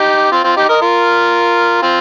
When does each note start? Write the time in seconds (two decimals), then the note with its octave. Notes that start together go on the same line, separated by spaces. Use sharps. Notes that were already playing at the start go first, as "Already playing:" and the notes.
Already playing: D#4 G4
0.32 C4 F4
0.44 C4 F4
0.57 D#4 G4
0.69 A#4 D#5
0.82 F4 A#4
1.82 C4 F4